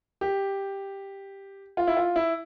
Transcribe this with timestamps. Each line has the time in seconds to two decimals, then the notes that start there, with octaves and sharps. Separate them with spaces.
0.21 G4
1.77 F4
1.87 E4
1.97 F4
2.16 E4